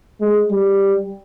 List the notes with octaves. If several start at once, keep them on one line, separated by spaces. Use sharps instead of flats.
G#3
G3